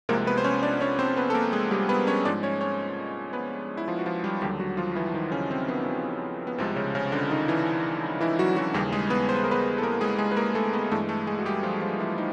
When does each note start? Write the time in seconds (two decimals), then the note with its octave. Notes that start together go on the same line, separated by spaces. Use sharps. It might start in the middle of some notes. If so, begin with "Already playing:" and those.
0.09 C2 C3 F3 G#3 A#3 A#4
0.27 B3 B4
0.38 C5
0.44 C#4 C#5
0.63 D4 D5
0.81 C#4 C#5
0.99 C4 C5
1.17 B3 B4
1.30 A4
1.35 A#3 A#4
1.53 G#3 G#4
1.71 G3 G4
1.89 B3 B4
2.07 C#4 C#5
2.25 G#2 F3 G#3 D4 D5
2.43 C#4 C#5
2.61 C#4 C#5
3.33 B3 B4
3.77 E4
3.88 F3 F4
3.99 F#4
4.06 F3 F4
4.24 G3 G4
4.42 D#2 D3 F#3 G3 G4
4.60 F#3 F#4
4.77 F3 F4
4.95 E3 E4
5.14 D#3 D#4
5.31 C#3 C#4
5.51 C4
5.68 B3
5.86 C4
6.47 B3
6.58 C2 C3 F3 G#3 C4
6.76 C#3 C#4
6.95 C#3 C#4
7.12 D3 D4
7.30 D#3 D#4
7.48 E3 E4
8.20 E3 E4
8.39 F#3 F#4
8.56 F#3 F#4
8.74 D#2 C#3 E3 G3 G4
8.92 G#3 G#4
9.10 B3 B4
9.29 C5
9.36 B4
9.44 A#4
9.51 B3 B4
9.78 A4
9.82 A#3 A#4
10.01 G#3 G#4
10.18 G#3 G#4
10.32 B4
10.37 A#3 A#4
10.55 A3 A4
10.73 B3 B4
10.91 G2 E3 G#3 A3 A4
11.09 A3 A4
11.27 G#3 G#4
11.39 F#4
11.45 G3 G4
11.63 F3 F4
11.81 F3 F4
11.99 E3 E4
12.18 D#4